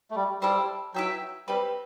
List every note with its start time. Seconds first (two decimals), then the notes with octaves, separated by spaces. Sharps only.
0.11 A3
0.16 G3
0.42 G3 E4 A4 C5
0.94 F#3 E4 B4 E5 G5
1.48 G3 C4 G4 B4